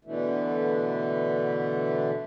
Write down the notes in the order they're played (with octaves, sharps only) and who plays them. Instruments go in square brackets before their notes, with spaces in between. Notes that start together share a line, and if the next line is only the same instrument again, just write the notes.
[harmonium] B2 D3 E3 A3